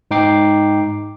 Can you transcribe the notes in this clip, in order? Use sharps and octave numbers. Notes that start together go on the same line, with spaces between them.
G#2 D#4 G5 D6 C7